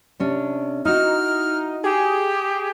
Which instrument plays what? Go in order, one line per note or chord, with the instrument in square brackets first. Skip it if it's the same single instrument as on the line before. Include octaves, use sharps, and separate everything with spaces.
[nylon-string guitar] C3 C#4 D4
[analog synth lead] D#4 [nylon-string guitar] E4 F#4 [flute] F6
[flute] G4 [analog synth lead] G#4